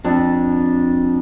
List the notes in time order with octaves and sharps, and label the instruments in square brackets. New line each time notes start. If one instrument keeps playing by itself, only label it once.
[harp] F2 [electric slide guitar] D4